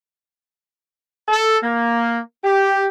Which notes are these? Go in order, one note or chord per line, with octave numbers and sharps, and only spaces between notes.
A4
A#3
G4